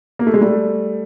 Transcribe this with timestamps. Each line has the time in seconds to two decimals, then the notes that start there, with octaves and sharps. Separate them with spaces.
0.19 A#3
0.27 A3
0.34 G#3
0.41 G3 A3